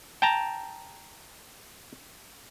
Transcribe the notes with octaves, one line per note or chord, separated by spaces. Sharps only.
G5 A5 A#5